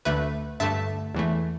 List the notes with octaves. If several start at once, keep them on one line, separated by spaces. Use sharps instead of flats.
D2 D3 A3 B4 E5
G2 D3 A3 E5 A5
E2 E3 A3